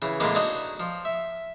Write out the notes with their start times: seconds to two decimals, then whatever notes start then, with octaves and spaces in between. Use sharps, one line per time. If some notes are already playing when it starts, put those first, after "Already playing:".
0.02 C#3 E3
0.20 A2 C3 E3 G#3 A#3 D6
0.35 D4 D#4 F#4 C#5 D#5
0.80 F3
1.05 E5